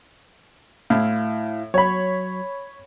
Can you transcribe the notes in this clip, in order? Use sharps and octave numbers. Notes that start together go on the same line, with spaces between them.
A2 E4 F5
F#3 C#5 B5